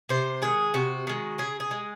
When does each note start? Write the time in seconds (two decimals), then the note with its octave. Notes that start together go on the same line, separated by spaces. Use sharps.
0.09 C3 C5
0.42 D#3 G#3 G#4
0.74 C3 F#4
1.07 D#3 G#3
1.38 C#3 G#4
1.60 G#4
1.71 G#3